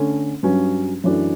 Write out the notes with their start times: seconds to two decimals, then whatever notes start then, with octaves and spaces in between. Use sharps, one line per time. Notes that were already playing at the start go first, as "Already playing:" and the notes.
Already playing: D3 A3 C#4
0.43 G2 F#3 C#4
1.04 F#2 E3 A3 D4 F#4